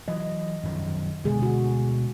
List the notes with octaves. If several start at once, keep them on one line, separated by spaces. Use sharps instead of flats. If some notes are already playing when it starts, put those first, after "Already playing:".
E3 F#3 D#5
F#2 D#3 F3
D2 B2 D3 G#3 G#4
F#4